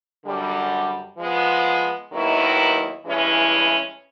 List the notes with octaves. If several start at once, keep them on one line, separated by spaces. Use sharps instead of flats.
F#2 D3 G3
F3 G#3 B3
D#2 D#3 F#3 B3 E4
G2 E3 G#3 C#4 E4